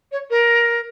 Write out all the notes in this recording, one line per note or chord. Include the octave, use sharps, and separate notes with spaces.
C#5
A#4